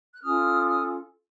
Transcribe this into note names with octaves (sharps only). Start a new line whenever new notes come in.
F#6
C#4 F4 A4 D#6 F6
D#6 F6